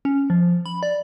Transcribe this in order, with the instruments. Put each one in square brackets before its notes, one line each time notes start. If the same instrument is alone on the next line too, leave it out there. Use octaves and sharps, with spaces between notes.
[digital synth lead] C#4
F3
B5
D5